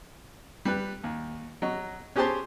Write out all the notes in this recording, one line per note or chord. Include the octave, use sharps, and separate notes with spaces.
G3 B4
D#2
F#3 D#5
C#4 G4 G#4 C5 A5 C6